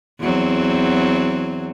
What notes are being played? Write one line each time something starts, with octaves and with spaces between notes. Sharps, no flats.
E2 F#3 C4